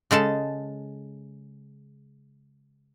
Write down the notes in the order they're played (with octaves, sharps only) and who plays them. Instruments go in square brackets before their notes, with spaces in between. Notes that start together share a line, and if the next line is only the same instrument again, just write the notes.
[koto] C#3 G#3 A4 A5